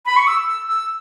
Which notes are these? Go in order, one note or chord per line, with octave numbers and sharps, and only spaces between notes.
B5
C#6
E6
E6
E6